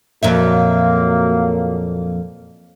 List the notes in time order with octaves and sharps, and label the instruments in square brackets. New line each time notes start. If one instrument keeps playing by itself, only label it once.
[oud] F2 A#2 E5 [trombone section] F#3 A#3